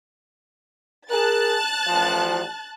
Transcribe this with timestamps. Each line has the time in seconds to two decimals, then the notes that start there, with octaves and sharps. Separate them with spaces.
1.10 G#4 A#4 A5 F#6 A6
1.87 A1 F3